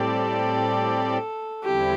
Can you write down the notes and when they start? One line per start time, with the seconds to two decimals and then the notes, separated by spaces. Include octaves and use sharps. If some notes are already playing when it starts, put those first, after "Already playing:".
Already playing: A2 G3 C4 G4 A4 D5
1.63 E2 D3 G3 C4 E4 G4